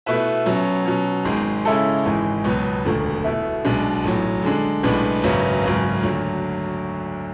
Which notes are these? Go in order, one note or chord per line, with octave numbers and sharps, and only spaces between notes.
B2 A3 E4 B4 E5
B2 F#3 C#4
B2 F#3 C#4
G#1 G#2 G#3
C#3 G#3 C#4 E4 A4
G#1 G#2 E3 G#3
C#2 B2 F#3 B3
E1 D2 D3
B2 A3 E4
B1 B2 G#3 D4
A1 A2 F#3
D3 G#3 D4
B1 A2 G#3 B3 D4
G#1 F#2 C#3 F#3 B3
G#1 F#2 C#3
D2 D3 F#3